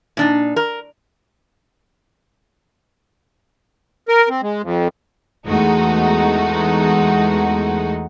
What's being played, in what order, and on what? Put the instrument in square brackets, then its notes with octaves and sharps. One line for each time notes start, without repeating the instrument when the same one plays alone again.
[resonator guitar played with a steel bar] A#2 D4 D#4
A#4
[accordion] A#4
C4
G#3
F2
[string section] E2 G#3 A3 D#4 F#4